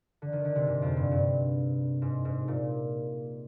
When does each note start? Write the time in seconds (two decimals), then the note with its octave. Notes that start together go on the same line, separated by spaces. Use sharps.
0.22 D3
0.33 D#3
0.45 D3
0.56 C3
0.67 G#2
0.82 F2
0.97 G2
1.12 G2
2.02 G#2
2.25 G#2
2.48 A#2